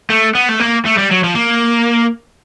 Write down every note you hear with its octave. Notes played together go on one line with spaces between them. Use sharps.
A3
B3
A3
A#3
A3
G3
F#3
F3
A#3